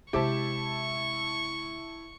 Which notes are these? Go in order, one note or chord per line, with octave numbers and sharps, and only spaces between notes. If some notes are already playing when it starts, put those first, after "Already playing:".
C3 G#3 E4 G4 C5 E5 A5 C#6